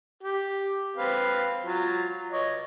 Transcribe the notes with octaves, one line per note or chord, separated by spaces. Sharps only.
G4
C4 B4 F5
F#3 F4
C#5 D#5